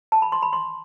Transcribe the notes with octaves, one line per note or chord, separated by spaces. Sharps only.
A5
B5
C6
B5
C6